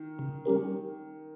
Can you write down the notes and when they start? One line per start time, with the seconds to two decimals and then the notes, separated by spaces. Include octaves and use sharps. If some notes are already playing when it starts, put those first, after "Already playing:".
Already playing: D#3
0.19 C#3
0.45 G3 C#4 G4 A#4